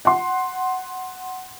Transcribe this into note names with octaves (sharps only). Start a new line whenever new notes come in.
F#5 C6